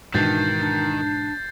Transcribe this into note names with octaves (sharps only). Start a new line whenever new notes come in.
G#2 B2 D#3 E3 D4 G6 A6 C7
D4